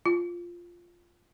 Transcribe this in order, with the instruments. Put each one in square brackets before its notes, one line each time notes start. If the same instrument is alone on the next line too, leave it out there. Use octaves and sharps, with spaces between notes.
[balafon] F4